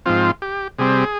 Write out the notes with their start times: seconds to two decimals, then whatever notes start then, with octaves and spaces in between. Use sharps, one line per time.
0.06 G#2 F3 C4 F4
0.42 G4
0.78 C3 G3 C4 G#4